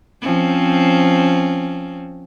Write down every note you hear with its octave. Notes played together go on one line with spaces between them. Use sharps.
F3 C4 C#4